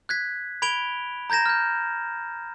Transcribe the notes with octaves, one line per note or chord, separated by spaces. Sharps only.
F#6 G#6 B6
B5 G#6 D7 F7 G7
A#5 G6 G#6 A#6 E7
F6 G6